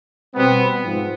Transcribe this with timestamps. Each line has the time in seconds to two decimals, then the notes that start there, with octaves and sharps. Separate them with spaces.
0.35 B2 G3 B3 C4
0.83 G#2 F3